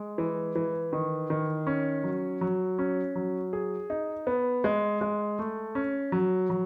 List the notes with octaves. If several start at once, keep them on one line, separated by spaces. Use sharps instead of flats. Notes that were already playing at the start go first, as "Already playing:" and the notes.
Already playing: G#3
E3
E3
D#3
D#3
C#4
F#3
F#3
C#4
F#3
G#4
D#4
B3
G#3
G#3
A3
C#4
F#3
F#3